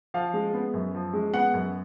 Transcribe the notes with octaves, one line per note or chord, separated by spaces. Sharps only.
F3 F5
G#3
B3
F#2
F3
G#3
B3 F#5
F#2